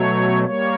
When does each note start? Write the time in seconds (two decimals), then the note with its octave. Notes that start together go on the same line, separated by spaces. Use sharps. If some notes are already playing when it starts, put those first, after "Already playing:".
Already playing: B2 F#3 A3 C#5
0.45 G3 A#3 C#5